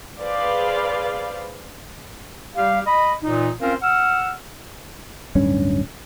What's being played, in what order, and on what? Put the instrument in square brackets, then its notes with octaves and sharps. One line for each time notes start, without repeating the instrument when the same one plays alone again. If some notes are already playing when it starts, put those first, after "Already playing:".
[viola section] G#4 B4 C5 D5 F5
[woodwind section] G3 G4 F5
D#5 B5
A#2 E3 D#4
C4 C#4 F4 A#4 C5 F5
F#5 E6 F6
[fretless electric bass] D1 G2 C#4